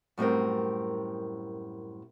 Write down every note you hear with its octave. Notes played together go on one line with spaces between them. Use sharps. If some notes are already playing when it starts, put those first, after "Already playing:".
F#2 A2 G3 C4 A#4